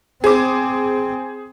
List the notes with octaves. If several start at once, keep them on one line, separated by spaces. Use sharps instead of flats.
C4 G#4 C5 D6